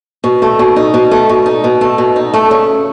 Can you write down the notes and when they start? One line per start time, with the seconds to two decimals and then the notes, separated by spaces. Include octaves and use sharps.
0.24 B2
0.42 A3
0.59 B2
0.76 D#4
0.94 B2
1.11 A3
1.29 B2
1.46 D#4
1.64 B2
1.81 A3
1.98 B2
2.16 D#4
2.34 A3
2.51 C#3